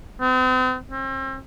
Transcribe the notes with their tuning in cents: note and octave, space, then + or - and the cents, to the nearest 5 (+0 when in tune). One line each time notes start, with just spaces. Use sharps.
C4 -40
C4 +40